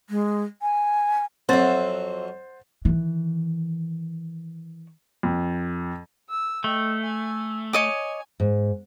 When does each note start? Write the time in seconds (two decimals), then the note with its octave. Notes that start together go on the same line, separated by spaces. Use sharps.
0.10 G#3
0.62 G#5
1.49 F2 F#3 C4 C5 E5 F#5 A6
2.85 D#3 E3
5.23 F2
6.30 E6
6.64 A3 D#5 G5
7.01 G#5
7.73 C#5 D#5 G#5 D6
8.40 G#2